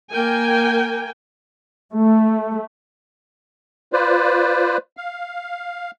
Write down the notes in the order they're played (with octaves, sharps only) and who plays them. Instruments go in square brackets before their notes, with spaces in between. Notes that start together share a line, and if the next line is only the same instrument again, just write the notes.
[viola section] A#3 A#4 G5 G#5
A3
[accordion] F4 B4 C5 D5
F5